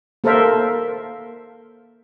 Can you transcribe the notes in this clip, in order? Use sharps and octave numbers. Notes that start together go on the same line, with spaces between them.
A#3 A4 A#4 C5 E5